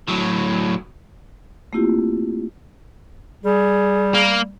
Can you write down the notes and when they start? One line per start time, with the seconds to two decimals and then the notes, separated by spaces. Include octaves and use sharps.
0.08 A2 F#3
1.73 A3 A#3 C4 E4 F4 G4
3.44 G3 G#4
4.14 A#3